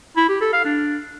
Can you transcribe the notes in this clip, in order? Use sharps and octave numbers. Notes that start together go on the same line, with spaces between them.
E4
G4
A4
F5
D4